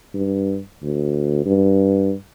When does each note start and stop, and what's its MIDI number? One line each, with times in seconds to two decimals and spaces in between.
0.14 0.59 43
0.83 1.42 38
1.46 2.13 43